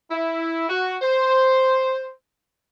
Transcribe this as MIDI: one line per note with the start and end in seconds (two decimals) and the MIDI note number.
0.10 0.68 64
0.69 0.96 66
1.02 2.11 72